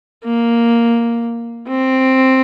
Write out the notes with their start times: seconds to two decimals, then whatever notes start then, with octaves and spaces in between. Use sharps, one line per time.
0.24 A#3
1.69 C4